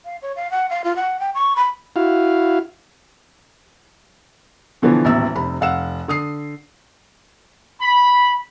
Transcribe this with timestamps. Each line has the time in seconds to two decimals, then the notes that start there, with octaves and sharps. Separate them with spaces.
0.05 F5
0.22 C#5
0.36 F5
0.51 F#5
0.70 F5
0.84 F4
0.96 F#5
1.20 G5
1.35 C#6
1.56 B5
1.96 E4 F#4 F5
4.82 B2 D3 E3 F3 B3 E4
5.04 D#1 A1 B2 E5 E6
5.35 F1 C3 B5
5.61 F1 F5 F#5 E6 E7
6.08 D3 D#6 C7
7.81 B5